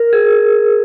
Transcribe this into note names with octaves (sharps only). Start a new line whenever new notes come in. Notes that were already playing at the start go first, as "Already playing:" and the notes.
Already playing: A#4
G#4